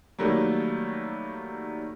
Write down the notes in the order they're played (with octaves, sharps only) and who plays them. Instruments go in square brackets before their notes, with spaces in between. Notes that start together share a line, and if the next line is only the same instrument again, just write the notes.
[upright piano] D#3 F#3 G3 A3 A#3